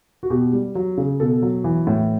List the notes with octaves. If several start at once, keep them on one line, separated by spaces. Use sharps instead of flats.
F#4
B2 G4
G3
F#3
C#3
B2 A4
F#3
E3
A2